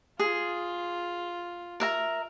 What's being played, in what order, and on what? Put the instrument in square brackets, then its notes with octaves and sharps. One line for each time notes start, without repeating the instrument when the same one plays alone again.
[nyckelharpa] F4 [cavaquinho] G#4
[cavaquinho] A#4 E5 A#5